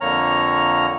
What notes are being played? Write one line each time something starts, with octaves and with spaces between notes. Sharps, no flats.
F2 D3 A#3 C#5 A#5 F6